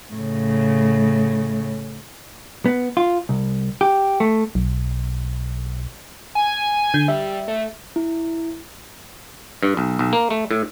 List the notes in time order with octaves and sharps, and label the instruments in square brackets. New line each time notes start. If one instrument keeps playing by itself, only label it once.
[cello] A2 C#3
[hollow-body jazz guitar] B3
F4
C2
G4
A3
[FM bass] B1
[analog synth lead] G#5
[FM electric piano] D3 G6
[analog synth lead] G3 [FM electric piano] E5
[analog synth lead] A3
[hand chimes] E4
[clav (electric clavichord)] G2
B1
B1
A#3
A3
A2